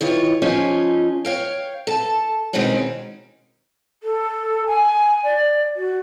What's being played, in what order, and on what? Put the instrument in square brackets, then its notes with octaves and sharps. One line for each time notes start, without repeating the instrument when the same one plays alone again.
[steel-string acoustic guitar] D#3 E3 F4 C#5
F3 C#4 D#4 F4 G#4 D#5
C#5 F5 G5
A4 A5
B2 D#3 G#3 C4 C#4 D#4
[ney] A4
G#5
D5
F#4